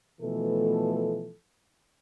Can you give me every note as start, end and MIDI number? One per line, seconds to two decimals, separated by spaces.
0.21 1.32 47
0.21 1.32 52
0.21 1.32 53
0.21 1.32 57
0.21 1.32 69